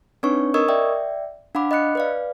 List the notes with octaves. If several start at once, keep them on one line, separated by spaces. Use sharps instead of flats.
C4 D4 D#4 B4 C#5 C#6
A#4 D#5 C#6 D#6 E6 G#6
D5 E5 G5
D4 F5 F#5 B5 D6
D#5 B5 F#6 C#7
B4 D5 F5